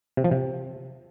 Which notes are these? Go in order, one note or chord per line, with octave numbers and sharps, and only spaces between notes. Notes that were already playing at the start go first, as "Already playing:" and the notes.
C3
F3
C3